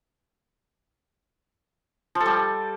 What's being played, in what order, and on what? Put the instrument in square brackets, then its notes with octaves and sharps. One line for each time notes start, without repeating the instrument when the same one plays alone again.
[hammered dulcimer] F3
A4
G3